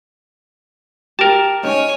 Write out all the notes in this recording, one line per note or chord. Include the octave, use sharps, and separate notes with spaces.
G4 A#4 A5
C#4 D#4 C#5 G#5